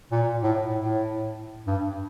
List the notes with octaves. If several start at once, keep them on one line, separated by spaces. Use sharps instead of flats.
A#2
A2
A2
G2